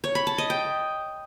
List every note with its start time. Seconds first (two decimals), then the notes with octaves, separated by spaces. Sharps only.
0.04 C#5
0.15 B5
0.27 A5
0.38 D#5
0.50 G5